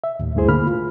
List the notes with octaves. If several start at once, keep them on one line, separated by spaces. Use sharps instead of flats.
E5
D#2 A2
D2 G2 A3 E4 G#4 C5
D3 A#3 B5 F6
F4